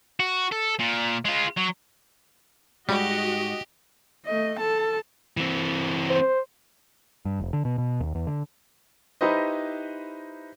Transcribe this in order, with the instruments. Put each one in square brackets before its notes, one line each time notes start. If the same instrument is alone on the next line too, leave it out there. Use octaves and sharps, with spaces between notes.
[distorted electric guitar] F#4
A4
A#2
G#3 F4
F#3
[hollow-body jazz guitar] G#2 [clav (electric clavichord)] G3 [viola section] F#4 D#5 [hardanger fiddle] G4
[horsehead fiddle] A3 D#5
A4 A5
[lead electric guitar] E3 C4
[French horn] C5
[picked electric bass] G2
F1
D3
B2
B2
D#2
E2
D3
[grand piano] D#4 E4 G4 B4 C5 D#5